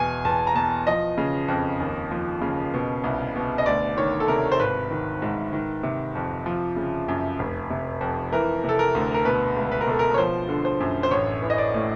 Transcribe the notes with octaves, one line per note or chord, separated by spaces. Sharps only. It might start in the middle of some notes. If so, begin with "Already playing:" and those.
Already playing: E2 B2 G#5
E2 A5
A#5
B2 A5
F3 D#5
C#3
F2
D#2
F3
C#3
B2
C2
B2
D#5
D2 D5
D#3 C#5
A4
C3 A#4
C5
G#1 B4
D#3
G#2
D#3
C3
F2
F3
C#3
F#2
F1
C3
F2
E3 A#4
C3
A4
A#4
D2
A#4
B2 B4
C#2
B4
A#4
B2 A4
A#4
C#5
F3 C5
D3
C5
F#2
C5
A1 C#5
E3
D#5
D5
A2